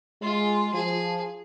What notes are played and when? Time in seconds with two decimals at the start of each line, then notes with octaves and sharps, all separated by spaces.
0.22 G#3 F4
0.74 F3 G#4